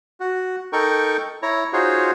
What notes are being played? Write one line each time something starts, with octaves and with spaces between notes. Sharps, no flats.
F#4
D#4 A4 A#4 G5 C#6
E4 C#5 A#5
D#4 F4 F#4 G#4 C5 C#5